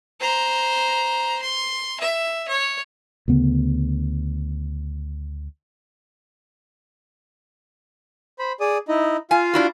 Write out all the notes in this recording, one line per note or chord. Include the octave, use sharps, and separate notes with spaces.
C5 A#5
C6
E5
C#5
D2 C#3 B3
C5 B5
G#4 D5 D#6
D#4 E4 D#5
F4 F5 G#5
D4 E4 F#4